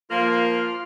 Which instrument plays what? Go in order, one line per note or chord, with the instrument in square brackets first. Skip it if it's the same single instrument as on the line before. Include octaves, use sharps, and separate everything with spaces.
[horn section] F3 A#3 [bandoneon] F4 F6